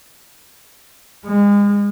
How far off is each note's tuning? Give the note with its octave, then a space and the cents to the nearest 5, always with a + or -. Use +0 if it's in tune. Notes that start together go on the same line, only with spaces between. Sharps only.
G#3 -35